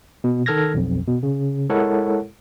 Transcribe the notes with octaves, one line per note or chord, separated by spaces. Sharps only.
B2
D#3 A4 F6 G#6 A#6
B1 F2
B2
C#3
G#3 E4 A4 A#4 C#5 F#5